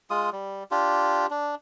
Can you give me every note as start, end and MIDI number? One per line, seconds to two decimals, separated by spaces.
0.10 0.30 56
0.10 0.30 65
0.10 0.30 87
0.32 0.63 55
0.71 1.26 62
0.71 1.26 65
0.71 1.26 67
1.30 1.55 62